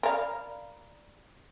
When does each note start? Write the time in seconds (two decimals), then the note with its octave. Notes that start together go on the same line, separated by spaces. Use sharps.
0.03 A#4 D5 F5 A#5 B5